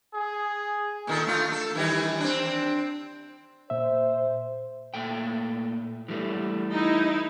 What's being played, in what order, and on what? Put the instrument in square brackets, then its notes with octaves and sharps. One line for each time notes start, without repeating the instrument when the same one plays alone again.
[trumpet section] G#4
[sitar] A#2 D#3 A4
A3 F4
A4
D#3 E3 G3
C4 D4
[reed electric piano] A#2 E5 [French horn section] C5
[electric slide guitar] A#2 A3 G5
E3 G3 A3
[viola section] D#4 E4